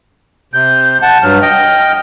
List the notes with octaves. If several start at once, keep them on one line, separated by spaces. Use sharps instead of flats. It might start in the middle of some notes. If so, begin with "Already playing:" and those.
C3 G6
F#5 A5
G2 F#3 F6
D#5 G5